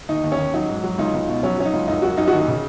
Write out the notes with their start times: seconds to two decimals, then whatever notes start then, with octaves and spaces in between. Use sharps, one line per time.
0.09 D#2 D#4
0.24 D#2
0.32 C#4
0.38 D#2
0.54 F#3 D#4
0.69 G#2
0.84 F#3
0.98 C#2 D#4
1.14 C#2
1.28 B2
1.43 F#3 C#4
1.58 F#3 C#4
1.65 D#4
1.73 C#2
1.88 F#2 D#4
2.02 F#2 F#4
2.17 F#2 D#4
2.28 F#4
2.33 D#2 D#4
2.48 C#3